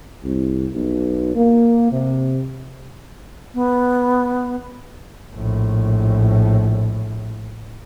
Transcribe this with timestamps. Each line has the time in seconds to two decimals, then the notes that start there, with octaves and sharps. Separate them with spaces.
0.22 C2
0.72 B1
1.35 A#3
1.91 C3
3.54 B3
5.33 A#1 A2